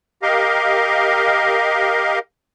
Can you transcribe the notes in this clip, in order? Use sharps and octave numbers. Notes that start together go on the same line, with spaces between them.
G4 A#4 D#5 F5